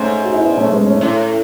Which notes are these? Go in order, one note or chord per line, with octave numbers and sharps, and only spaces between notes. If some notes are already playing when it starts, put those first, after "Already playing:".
Already playing: G#2 A3 C#4
F#4
E4
B3 D4
A3 C#4
A3
G#3 B3
A3 C#4
D4
A2 A3 C#4